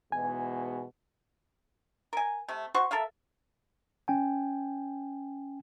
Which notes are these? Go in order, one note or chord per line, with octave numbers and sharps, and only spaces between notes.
E2 G#2 B2 G#5
A#4 G#5
C3 A3
F#4 C5 C#6
A4 A#4 E5 F5
C#4 G5 G#5